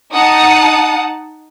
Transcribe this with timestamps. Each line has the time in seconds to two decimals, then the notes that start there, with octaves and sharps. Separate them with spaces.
0.12 D#4 F#5 A5 D#6